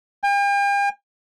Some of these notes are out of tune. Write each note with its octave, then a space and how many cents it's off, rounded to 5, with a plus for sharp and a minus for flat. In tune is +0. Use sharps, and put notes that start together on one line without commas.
G5 +45